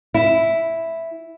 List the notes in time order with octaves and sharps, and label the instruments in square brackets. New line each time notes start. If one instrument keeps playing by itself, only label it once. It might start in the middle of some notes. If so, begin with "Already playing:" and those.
[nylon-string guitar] E4